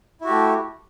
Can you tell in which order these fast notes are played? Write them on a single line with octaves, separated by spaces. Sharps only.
E4 F#4 G4 A3